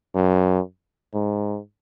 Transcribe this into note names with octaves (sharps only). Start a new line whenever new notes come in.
F#2
G#2